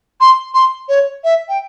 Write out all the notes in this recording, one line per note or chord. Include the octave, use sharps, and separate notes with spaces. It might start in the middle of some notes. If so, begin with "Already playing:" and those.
C6
C6
C#5
E5
G5